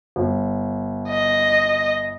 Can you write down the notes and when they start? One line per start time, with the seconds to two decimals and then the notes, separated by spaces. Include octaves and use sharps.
0.16 G1
1.09 D#5